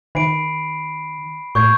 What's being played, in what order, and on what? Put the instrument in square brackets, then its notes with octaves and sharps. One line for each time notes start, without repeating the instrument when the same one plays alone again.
[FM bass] D#3 [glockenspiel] B5 C7 D7
[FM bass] A2 [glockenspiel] C#6 G6 G#6